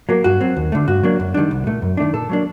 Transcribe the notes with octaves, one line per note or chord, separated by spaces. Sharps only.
F#3 A#3
G2 F#4
F#3 C4
D#2
D3 A3
G2 F#4
F#3 A#3 D4
F#2
D#3 G3 D4
C2
A#2 A3
F#2
D#3 A3 D4
A#2 A4
F#3 A#3 D4